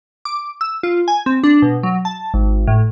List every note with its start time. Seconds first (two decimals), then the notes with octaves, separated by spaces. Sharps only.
0.25 D6
0.61 E6
0.83 F4
1.08 G#5
1.26 C4
1.44 D4
1.62 B2
1.83 F#3
2.05 A5
2.34 G#1
2.67 A2